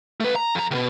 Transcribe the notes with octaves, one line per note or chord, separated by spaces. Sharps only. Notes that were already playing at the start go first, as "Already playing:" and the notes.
A3 B4
A#5
F2 A#5
C#2 B2